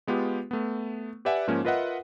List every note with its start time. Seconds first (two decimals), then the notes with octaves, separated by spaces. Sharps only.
0.07 G#3 B3 F4 G4
0.51 A3 B3
1.25 G4 B4 D5 E5 F#5 G#5
1.47 G#2 F3 A#3 C#4
1.65 F4 A#4 B4 D#5 E5 F#5